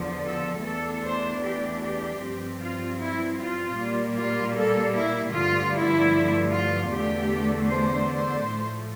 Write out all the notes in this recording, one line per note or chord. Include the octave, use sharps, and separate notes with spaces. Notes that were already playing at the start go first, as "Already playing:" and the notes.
Already playing: E2 D3 F3
A4
E2 E3 A3 D4 A4
C5
G4
G4
G2 F3 C4
F4
E4
F4
A#2 G3 A#3
F4
A4
E4
G2 D3 F3 A3 F4
E4
F4
E2 D3 A3 D4 G4
C5
C5
A2 F3 A3